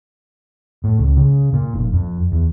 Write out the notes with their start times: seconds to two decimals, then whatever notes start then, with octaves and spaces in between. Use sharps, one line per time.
0.84 A2
0.99 C#2
1.16 C#3
1.53 A#2
1.74 F1
1.93 F2
2.32 E2